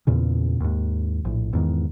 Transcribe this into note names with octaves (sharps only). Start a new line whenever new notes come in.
E2 A#2 C#3
D#2 G#2
A#1 A2
E2 G#2 D#3